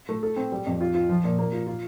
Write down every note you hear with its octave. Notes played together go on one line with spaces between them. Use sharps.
A3
A4
C4
G3
F2
F4
F4
F3
A#2
A#3
F4
F4